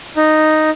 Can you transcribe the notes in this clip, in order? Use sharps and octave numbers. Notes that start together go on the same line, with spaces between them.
D#4